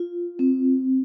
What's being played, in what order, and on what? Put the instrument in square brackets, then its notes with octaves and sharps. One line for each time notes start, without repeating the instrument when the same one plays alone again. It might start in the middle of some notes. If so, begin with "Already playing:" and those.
Already playing: [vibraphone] F4
C4